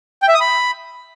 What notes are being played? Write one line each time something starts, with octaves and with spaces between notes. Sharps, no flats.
G5
E5
D#6
B5